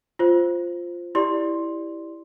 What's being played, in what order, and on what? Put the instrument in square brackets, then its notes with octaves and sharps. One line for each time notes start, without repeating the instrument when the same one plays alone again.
[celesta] F4 C5
E4 G4 D5 C6